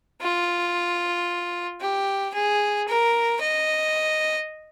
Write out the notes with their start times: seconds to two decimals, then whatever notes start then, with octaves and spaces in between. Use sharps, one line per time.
0.22 F4
1.81 G4
2.34 G#4
2.88 A#4
3.41 D#5